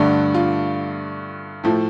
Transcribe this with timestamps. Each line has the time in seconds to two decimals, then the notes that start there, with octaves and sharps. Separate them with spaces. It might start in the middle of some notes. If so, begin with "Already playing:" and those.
Already playing: G2 D3 A3 D4
0.34 F4
1.64 A2 F3 A3